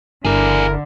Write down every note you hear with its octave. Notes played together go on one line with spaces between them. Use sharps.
G1 D3 E4 G#4 A#4 D5